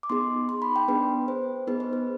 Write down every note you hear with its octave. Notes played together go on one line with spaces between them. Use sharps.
D6
B3 D#4 G#4 C6
C6
B5
G5
B3 D4 G#4 B4
C5
B3 D#4 G#4 B4
C5
B4